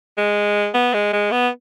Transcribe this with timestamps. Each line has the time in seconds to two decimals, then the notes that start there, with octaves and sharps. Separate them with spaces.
0.18 G#3
0.74 B3
0.94 G#3
1.13 G#3
1.31 B3